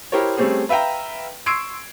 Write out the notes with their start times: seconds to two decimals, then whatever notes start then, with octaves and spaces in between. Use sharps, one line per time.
0.12 E4 G4 A#4 C5 C#5
0.37 G3 A3 C4 C#4 G4 G#4
0.69 B4 E5 F5 G5 A#5
1.46 C6 C#6 E6 G#6 C7 D7